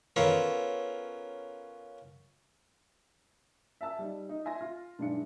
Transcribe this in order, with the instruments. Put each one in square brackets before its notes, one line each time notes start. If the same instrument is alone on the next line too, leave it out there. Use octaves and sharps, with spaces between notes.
[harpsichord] B3 C#4 F4 A4 A#4
[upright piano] E5 G#5 A5 E6
G3 D#4
D#4
E5 G#5 C6 A#6
F4
B1 G2 G#3 D4 E4 C#7